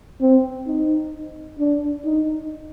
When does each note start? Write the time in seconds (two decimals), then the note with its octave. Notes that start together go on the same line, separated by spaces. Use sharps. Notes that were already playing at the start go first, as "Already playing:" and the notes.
0.21 C4
0.67 D#4
1.59 D4
2.05 D#4